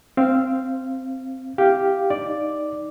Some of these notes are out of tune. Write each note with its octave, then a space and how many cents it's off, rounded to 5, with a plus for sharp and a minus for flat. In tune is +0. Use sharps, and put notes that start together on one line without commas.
C4 +0 F5 -20
E4 -15 G4 +0 F5 +0
D#4 +0 D5 +0